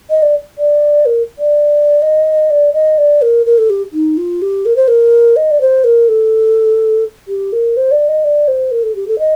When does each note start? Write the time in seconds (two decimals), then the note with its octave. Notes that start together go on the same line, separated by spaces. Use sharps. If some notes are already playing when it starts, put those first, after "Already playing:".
0.10 D#5
0.22 D5
0.58 D5
1.06 A#4
1.38 D5
2.02 D#5
2.50 D5
2.73 D#5
2.98 D5
3.22 A#4
3.46 A#4
3.58 A4
3.70 G4
3.93 D#4
4.17 F4
4.42 G4
4.65 A#4
4.76 C5
4.88 A#4
5.36 D#5
5.51 D5
5.61 C5
5.84 A#4
6.08 A4
7.28 G4
7.52 A#4
7.76 C5
7.91 D5
8.08 D#5
8.24 D5
8.48 C5
8.71 A#4
8.83 A4
8.95 G4
9.07 A4
9.19 D#5